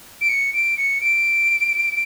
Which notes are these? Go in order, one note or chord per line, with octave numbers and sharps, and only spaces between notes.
D7
C#7
D7
C#7
D7